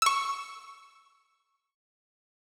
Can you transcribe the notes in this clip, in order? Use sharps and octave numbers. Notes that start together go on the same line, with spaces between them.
C#6 E6